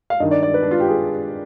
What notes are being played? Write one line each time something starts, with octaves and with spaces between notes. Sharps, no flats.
F5
G2 D#3 D#5
D5
D5
B4
D4
F4
G4
G#4